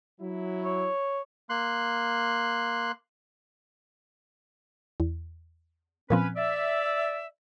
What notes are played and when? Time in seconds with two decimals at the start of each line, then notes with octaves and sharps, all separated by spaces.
0.21 F#3 E4
0.64 C#5
1.49 A#3 C6 F#6
5.00 E2
6.10 A#2 F3 C4 C#4 B4
6.36 D5 E5